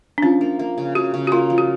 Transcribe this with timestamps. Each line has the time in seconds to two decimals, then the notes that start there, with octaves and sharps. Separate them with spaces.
0.18 D4
0.22 F3 C#4
0.41 A#3
0.59 A#3
0.78 C#3
0.95 C#3 F#4
1.14 C#3
1.27 F#4
1.32 A#3 F4
1.50 F3
1.58 F#4